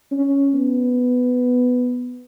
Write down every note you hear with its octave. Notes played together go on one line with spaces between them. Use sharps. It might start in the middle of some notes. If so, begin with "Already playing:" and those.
C#4
B3